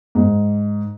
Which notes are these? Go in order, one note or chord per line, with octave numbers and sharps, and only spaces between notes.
G#2